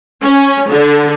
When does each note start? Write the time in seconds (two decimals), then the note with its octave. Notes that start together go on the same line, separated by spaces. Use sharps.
0.23 C#4
0.71 D3